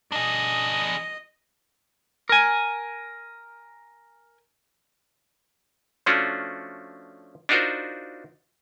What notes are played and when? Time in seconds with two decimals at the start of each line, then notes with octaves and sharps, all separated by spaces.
0.12 D4 G#4 D#5
2.29 A#4 G#5
6.06 F3 A3 C#4 D4 F4 F#4
7.49 D4 D#4 F4 F#4 A#4 C5